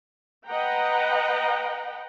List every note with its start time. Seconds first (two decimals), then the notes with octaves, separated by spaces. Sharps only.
0.48 B4 D#5 F#5 G5 A#5